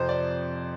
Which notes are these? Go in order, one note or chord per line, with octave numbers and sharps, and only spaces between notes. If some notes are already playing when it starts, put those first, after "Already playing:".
Already playing: F2 C3 F3 C5
D5